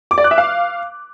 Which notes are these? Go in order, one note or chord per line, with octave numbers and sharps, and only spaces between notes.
D6
D5
F#6
E5
F5